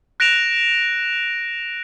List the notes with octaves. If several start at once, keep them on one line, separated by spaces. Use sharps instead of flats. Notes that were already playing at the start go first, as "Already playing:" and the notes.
F#6 A#6 D7 E7 F7